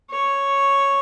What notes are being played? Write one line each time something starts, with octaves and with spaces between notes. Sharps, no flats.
C#5